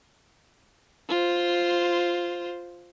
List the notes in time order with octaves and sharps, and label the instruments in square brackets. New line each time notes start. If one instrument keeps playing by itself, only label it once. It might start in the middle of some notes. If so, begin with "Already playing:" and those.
[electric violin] F4 C5